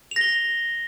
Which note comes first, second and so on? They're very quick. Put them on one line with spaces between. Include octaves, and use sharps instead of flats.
F7 A#6 G7